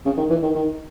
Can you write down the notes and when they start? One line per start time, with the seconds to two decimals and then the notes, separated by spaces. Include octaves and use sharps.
0.05 C#3
0.17 D#3
0.30 E3
0.42 D#3
0.55 D#3